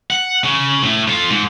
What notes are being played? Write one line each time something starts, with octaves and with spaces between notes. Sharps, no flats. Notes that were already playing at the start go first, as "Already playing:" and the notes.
F#5
C#3
A2
F4 A4
G#2